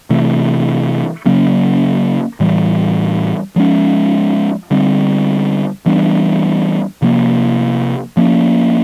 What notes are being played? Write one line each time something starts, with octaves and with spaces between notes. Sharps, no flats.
C3 E3 A3
C#3 F#3 A#3 C#4
A2 E3 G3
F3 G#3 C#4
D3 G3 C4
E3 G3 B3 D4
C3 F3 A#3
F3 A#3 C#4